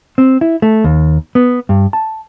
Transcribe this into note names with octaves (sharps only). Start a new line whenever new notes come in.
C4
E4
A3
D#2
B3
G2
A5